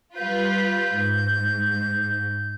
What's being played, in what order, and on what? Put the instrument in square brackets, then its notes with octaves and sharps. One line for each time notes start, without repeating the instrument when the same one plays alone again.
[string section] G3 F4 B4 [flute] G6
[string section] G#2